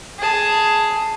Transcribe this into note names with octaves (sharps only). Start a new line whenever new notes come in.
G#4 A5